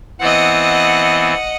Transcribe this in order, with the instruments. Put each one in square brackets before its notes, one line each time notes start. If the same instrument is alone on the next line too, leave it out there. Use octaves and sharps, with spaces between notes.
[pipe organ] E3 B3 C4 [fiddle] D#5 F#5